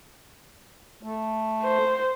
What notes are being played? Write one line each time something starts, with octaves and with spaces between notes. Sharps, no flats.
A3
C5